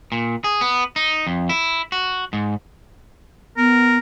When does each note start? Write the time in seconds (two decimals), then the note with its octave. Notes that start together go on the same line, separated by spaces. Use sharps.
0.12 A#2
0.44 G#4
0.61 B3
0.96 D#4
1.27 F2
1.49 E4
1.92 F#4
2.33 G#2
3.57 B3 A#4